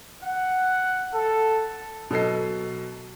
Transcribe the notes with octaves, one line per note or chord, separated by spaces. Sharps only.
F#5
A4
B2 F#3 A4 D#5 C7